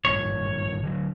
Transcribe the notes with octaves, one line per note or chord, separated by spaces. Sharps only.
G#1 G2 A#2 C#5
D3 F3 F#3